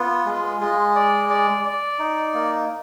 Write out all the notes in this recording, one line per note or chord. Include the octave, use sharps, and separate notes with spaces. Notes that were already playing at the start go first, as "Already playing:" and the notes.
Already playing: B3 F4
G#3
G#3
D5
D5
D5
D#4
A#3